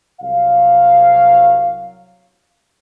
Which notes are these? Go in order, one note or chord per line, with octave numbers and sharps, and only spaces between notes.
C2 F#3 F5